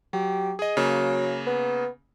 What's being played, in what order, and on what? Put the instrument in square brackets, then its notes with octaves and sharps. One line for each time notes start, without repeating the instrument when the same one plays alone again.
[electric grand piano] F#3 [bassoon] G4
[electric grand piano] G#4 D#5
[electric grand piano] C#3 A#3 [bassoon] F#3
[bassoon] B3